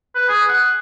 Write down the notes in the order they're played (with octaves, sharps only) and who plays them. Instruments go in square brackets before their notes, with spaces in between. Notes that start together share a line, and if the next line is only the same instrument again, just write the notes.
[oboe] B4
G#4
F#5